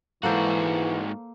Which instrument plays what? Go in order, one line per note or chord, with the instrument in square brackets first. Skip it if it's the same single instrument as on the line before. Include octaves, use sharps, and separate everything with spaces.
[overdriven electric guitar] G#2 F#4 [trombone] E3 [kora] A#3 A4 C5